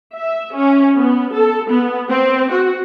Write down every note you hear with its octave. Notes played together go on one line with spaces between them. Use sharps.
E5
C#4
B3
A4
B3
C4
F#4